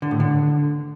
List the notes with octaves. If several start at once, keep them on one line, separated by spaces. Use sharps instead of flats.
D3
A2
D3